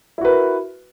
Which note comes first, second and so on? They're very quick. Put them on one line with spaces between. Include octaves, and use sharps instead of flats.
E4 F#4 B4 A#4